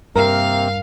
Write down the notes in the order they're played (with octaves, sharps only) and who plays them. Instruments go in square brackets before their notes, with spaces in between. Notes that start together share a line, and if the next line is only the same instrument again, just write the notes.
[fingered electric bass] G2 [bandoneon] C3 A#3 C4 [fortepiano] A#4 [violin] F5